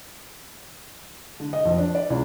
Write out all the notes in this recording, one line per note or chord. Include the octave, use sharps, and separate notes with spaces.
D3
D#5
F2
D4
D5
C#2